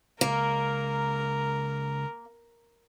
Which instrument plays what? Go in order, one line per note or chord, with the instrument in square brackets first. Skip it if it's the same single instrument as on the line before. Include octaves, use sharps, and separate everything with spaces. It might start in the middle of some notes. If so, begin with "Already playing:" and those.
[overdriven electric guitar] C#2 [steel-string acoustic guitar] A#3 [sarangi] A#4